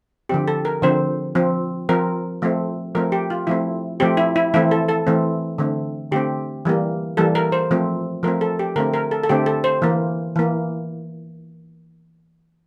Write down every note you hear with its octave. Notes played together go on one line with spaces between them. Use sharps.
D3 F3 C4 G4
A4
A#4
D3 F3 C4 C5
F3 C4
F3 C4 A#4
F3 A3 C4
F3 A3 C4 A#4
G4
F4
F3 A3 C4 E4
F3 A3 C4 G4
E4
E4
E3 A3 C4 E4
A4
A4
E3 A3 C4
D3 A3 C4
D3 A3 C4 G4
E3 G3 A#3
E3 G3 A#3 A4
A#4
C5
F3 A3 C4
F3 A3 C4 A#4
A4
G4
D3 A3 C4 A#4
A#4
A4
A4
D3 A3 C4 G4
A4
C5
E3 A#3
E3 A#3